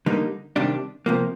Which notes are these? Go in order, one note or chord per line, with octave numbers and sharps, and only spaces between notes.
D3 G3 A#3 D#4
C3 D#3 G3 D4
C3 F3 A#3